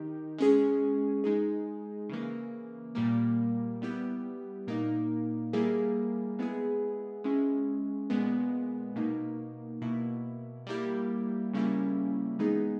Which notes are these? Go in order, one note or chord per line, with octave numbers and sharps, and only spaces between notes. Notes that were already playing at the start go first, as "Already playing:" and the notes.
Already playing: D#3 D#4 G4
G#3 C#4 G#4
G#3 D#4 G#4
C#3 E3 A#3
A#2 G3 A#3
G3 B3 E4 G4
A#2 A#3 D#4
G3 A#3 E4 G#4
G#3 B3 E4 G#4
G#3 C#4 E4 G#4
A#2 G#3 B3
B2 A#3 D#4
B2 A#3 E4
G3 A#3 E4 G4
C#3 G3 A#3 C#4 E4
E3 G#3 B3 D#4 G#4